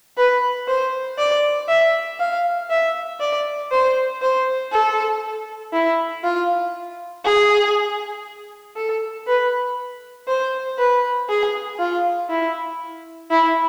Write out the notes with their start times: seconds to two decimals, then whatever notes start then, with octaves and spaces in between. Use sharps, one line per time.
0.17 B4
0.68 C5
1.18 D5
1.68 E5
2.20 F5
2.70 E5
3.20 D5
3.71 C5
4.22 C5
4.72 A4
5.73 E4
6.24 F4
7.25 G#4
8.76 A4
9.27 B4
10.28 C5
10.78 B4
11.29 G#4
11.79 F4
12.30 E4
13.31 E4